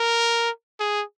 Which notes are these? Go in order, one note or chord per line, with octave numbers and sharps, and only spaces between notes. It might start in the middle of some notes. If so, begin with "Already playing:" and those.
Already playing: A#4
G#4